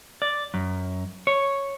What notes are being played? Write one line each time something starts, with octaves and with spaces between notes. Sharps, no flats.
D5
F#2
C#5